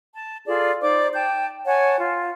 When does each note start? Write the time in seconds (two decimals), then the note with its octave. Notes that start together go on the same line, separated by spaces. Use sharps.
0.16 A5
0.47 F4 G#4 A4 D5
0.81 D#4 C5 D5 D6
1.13 G5 A5 G6
1.65 C#5 F#5 G#5 A5
1.99 F4